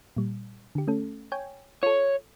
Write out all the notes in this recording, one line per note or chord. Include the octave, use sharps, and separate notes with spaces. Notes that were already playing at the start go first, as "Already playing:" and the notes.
A#2 G3
D3 G4
A3 C#4 A4
C#5 G5 G#5
F4 A4 C#5